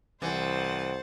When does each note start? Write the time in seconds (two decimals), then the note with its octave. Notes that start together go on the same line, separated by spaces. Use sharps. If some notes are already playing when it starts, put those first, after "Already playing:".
0.22 C2 E3 C5 F#5 A6